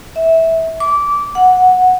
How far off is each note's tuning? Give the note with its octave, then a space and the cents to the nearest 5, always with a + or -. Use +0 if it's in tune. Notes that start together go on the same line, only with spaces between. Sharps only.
E5 -15
D6 -20
F#5 -10